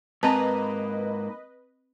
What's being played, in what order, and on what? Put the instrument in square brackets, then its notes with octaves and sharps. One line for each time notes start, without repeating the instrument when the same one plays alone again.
[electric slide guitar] G#2 A#3 A#5 [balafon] C4 A5 [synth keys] B4 D#5